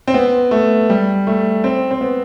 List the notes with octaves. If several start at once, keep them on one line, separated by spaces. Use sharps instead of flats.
C4
B3
A3
G3
A3
C4
C4
B3